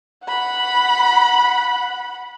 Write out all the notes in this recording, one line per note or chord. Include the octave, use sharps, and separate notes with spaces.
F#5 B5